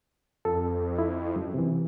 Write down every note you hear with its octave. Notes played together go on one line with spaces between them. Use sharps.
F2 A4
E4
F#2
C3 E3